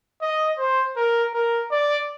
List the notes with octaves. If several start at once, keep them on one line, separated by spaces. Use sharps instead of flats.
D#5
C5
A#4
A#4
D5